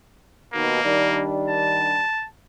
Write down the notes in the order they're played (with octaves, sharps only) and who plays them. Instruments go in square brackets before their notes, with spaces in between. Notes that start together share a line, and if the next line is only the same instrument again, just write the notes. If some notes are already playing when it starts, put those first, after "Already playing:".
[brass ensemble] D#2 B2 D#3 [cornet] A#3
[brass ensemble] D#3 G3 D4
[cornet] A5